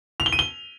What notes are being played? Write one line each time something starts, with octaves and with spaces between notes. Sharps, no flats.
F7
G7
D#7
G7